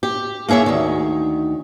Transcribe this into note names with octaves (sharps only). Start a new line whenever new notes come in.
G4
A#3 E4 G#4 C#5 E5
D2 D#3